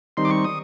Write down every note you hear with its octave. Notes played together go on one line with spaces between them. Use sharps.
D#3 G3 C4 D#4 C6
D6
C#6
D#6